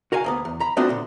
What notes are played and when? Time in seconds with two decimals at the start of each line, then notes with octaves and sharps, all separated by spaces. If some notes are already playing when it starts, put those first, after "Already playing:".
0.12 F#4 A#4 F5 G#5
0.24 D2 A#3 B3
0.45 E2
0.60 A#5 B5
0.77 A3 B3 C4 D4 F4 F#4
0.89 A#2 D3